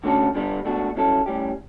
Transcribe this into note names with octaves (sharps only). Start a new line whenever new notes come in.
D3 A3 C#4 F#4 A4
G2 D3 G3 B3
C#2 B2 A3 D4 F#4
G2 F#3 C#4 E4 A4
A2 G3 C#4 G4